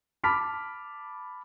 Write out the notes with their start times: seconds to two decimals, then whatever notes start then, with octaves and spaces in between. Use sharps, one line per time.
0.24 A5 B5 D6 F6 B6